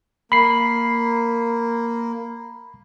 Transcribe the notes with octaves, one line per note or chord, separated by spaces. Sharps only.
A#3 B5 C7